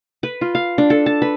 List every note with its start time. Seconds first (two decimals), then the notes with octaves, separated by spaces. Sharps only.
0.23 B4
0.41 F4
0.55 F5
0.78 D4
0.90 A4
1.06 A5
1.22 B4